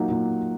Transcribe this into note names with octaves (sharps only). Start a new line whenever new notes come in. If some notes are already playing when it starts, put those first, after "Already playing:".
Already playing: A#2 F#3 A#3 D#4 F#5
A#2